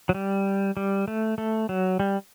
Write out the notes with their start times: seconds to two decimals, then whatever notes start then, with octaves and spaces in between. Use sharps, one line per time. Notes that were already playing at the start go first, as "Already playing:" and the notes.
0.09 F#3
0.14 G3
0.77 G3
1.08 A3
1.38 A3
1.69 F#3
2.00 G3